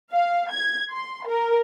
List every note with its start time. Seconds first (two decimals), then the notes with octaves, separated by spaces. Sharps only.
0.12 F5
0.50 G#6
0.92 C6
1.27 A#4